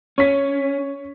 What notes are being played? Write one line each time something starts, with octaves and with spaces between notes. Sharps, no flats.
C#4 C#5 B6